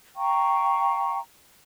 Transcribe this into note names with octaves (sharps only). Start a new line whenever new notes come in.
F5 G5 A#5 C#6